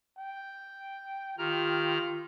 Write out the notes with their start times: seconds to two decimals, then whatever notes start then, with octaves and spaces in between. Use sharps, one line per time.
0.18 G5
1.38 D#3 F4 G4 A#5 F6